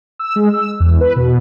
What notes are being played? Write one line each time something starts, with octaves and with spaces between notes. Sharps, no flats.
E6
G#3
E6
E2
B4
B2